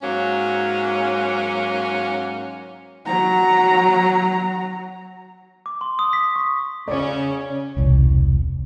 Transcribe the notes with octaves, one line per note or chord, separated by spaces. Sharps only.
G#2 F#3 A#3 C#4
F#3 A#5
D6
C6
D#6
B6
C#6
C#3 C#4 C#5 D5
E1 C2